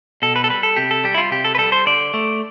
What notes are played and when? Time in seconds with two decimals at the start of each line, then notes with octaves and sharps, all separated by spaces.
0.22 B2 A4
0.36 B4
0.44 A4
0.50 G3 B4
0.63 A4
0.76 C3 G4
0.91 A4
1.04 G3 G4
1.14 E4
1.18 F4
1.31 C3 G4
1.44 A4
1.55 B4
1.58 G3 A4
1.72 C5
1.86 D3 D5
2.14 A3